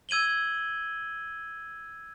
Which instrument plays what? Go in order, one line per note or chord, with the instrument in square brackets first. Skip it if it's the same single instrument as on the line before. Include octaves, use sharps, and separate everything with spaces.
[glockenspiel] E6 G#6 D#7 F#7 G7